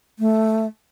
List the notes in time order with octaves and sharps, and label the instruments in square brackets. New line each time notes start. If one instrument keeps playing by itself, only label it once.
[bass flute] A3